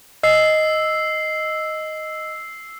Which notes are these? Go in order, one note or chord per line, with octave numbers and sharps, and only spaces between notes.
D#5 E6 C7